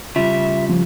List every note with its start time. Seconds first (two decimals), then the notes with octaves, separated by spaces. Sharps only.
0.16 C#3 G3 F4 E5
0.69 F3